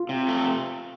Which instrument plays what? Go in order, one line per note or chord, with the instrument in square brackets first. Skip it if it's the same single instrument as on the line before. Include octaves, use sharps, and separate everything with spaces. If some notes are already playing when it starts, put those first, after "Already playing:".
Already playing: [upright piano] F4
[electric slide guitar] C3
A3